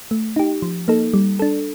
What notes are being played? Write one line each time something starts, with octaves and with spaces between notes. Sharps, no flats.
A3
D#4 G4
F3
A#3 D#4 A4
G3
D4 A4